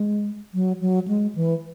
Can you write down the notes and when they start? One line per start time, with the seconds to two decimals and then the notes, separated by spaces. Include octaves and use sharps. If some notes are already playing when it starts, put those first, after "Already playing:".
Already playing: G#3
0.54 F#3
0.81 F#3
1.08 G#3
1.35 E3